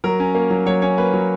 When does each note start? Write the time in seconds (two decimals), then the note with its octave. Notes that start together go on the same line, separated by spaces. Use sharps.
0.04 F#3 A#4
0.20 C#4
0.35 A#3
0.50 F#3
0.66 F#3 C#5
0.82 C#4 C#5
0.98 A#3 B4
1.14 F#3